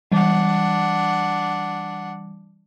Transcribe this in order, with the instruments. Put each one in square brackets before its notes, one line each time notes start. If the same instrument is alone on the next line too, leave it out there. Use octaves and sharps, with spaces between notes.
[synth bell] E3 G3 [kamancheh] D4 F#5